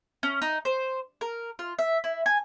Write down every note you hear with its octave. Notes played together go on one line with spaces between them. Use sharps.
C#4
D#4
C5
A#4
F4
E5
E4
G#5